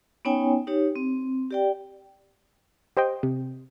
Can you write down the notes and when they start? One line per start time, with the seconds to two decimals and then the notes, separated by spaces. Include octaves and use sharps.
0.25 B3 C#4 D#4 C#5 G5 G#5
0.67 D#4 G4 C#5
0.96 C4
1.51 G4 D5 G5
2.97 G4 C5 D#5 G5
3.23 C3